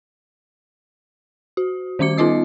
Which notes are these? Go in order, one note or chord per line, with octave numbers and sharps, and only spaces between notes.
F#4
D#3 G3 C#4 D6 C#7
B3 D#4 F4 D#5 D#6